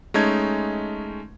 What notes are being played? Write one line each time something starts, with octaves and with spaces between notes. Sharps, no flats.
G#3 A3 C#4 D#4 A5 G#6